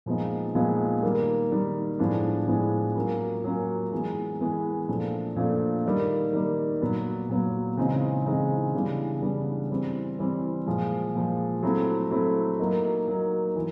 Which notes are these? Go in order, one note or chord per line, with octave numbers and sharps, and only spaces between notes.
A#2 F3 G#3 B3 D#4
A#2 F3 G#3 B3 D#4
D#3 G3 A#3
D#3 G3 A#3
A2 F3 G#3 B3 D4
A2 F3 G#3 B3 D4
F#3 A#3 C#4 F4
F#3 A#3 C#4 F4
E3 G#3 B3
E3 G#3 B3
A#2 F3 A3 D4
A#2 F3 A3 D4
D#3 G3 A#3 D#4
D#3 G3 A#3 D#4
A#2 F#3 B3
A#2 F#3 B3
C#3 E3 G#3 C4 D#4
C#3 E3 G#3 C4 D#4
C#3 E3 G3 B3 D4
C#3 E3 G3 B3 D4
E3 G3 C4
E3 G3 C4
A#2 F3 G#3
A#2 F3 G#3
F#3 A3 C4 E4
F#3 A3 C4 E4
F#3 A#3 D#4
F#3 A#3 D#4
E3